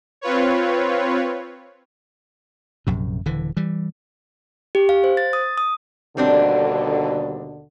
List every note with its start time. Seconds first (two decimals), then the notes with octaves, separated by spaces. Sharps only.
0.21 C4 F4 B4 C#5
2.87 A#1 F#2 C3
3.26 D#1 D3 E3
3.57 E3 G3
4.75 G4
4.89 F5
5.04 C5
5.17 A6
5.33 D#6
5.58 D#6
6.17 D#2 B2 D3 G3 C4 D4